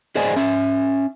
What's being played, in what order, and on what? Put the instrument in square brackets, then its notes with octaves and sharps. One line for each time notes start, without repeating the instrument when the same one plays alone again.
[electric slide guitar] G#4 C5 D5 D#5 G#5
C#4 E5